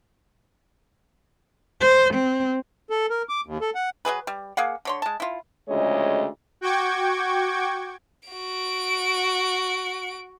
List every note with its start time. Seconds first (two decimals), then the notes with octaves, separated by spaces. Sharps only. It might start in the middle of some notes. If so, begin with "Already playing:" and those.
1.81 C5
2.14 C4
2.90 A4
3.10 A#4
3.29 D6
3.46 D#2
3.61 A4
3.75 F#5
4.05 F#3 G3 G#4 B4
4.27 G3
4.57 A#3 G#4 F5 F#5
4.85 D3 C#5 C6
5.02 G#3 A5
5.20 E4 F4
5.69 D2 C#3 F3 G#3 C#5 D#5
6.61 F#4 G5 C#6 D6 G#6
8.29 F#4 D7